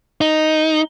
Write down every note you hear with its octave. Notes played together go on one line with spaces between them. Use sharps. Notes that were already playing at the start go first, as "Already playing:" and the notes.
D#4